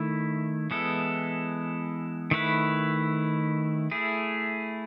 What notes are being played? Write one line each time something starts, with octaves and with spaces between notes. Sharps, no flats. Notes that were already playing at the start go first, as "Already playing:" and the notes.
Already playing: D#3 A3 E4
E3 G#3 B3 E4 A4
D#3 A3 E4 B4
A3 E4 G#4